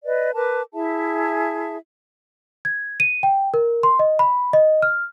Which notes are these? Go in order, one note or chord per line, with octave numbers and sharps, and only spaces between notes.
B4 D5 D#5
A#4 B4 A5 D6
E4 G#4 E5 A5
G#6
D#7
G5
A#4
C6
D#5
B5
D#5
F6